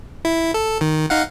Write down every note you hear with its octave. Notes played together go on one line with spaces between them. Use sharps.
E4
A4
D#3
D#4 F5 F#5